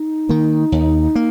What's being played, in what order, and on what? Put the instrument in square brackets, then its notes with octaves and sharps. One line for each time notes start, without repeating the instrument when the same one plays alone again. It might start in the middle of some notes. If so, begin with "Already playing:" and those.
Already playing: [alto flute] D#4
[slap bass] D#3 A#3
D#2
A#3